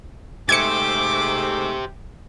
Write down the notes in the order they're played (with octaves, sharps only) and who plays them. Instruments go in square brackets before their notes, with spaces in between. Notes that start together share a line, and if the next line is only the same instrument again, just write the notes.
[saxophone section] G#2 G#3 A3 [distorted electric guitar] G4 C5 [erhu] D6 [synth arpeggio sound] G#6 C#7